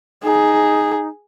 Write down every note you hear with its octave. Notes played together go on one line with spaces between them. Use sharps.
D#4 G#4